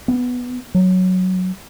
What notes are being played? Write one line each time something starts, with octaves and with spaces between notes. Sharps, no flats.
B3
F#3